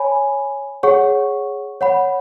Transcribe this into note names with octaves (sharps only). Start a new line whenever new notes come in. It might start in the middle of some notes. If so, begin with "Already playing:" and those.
Already playing: C#5 G#5 B5
G#4 C#5 F#5 C#6
C#5 F#5 B5